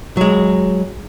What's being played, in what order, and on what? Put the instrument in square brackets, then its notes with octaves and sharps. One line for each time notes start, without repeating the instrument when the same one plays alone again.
[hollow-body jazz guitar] F#3 G#3